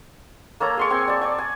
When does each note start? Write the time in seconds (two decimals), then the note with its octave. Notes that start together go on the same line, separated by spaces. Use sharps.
0.60 A#3 A4 C#5 A#5
0.77 G#4 C6 C#6
0.90 C4 G#5
1.08 D5 A5
1.21 D5 C#6
1.38 G#5